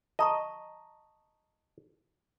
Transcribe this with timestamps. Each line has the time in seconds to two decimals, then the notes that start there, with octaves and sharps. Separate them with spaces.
0.19 D#5 A5 A#5 C#6